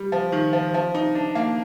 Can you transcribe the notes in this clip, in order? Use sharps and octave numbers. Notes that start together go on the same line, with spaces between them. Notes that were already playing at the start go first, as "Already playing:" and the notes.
Already playing: G3
F3
D#3
F3
F3
D#4
D4
A#3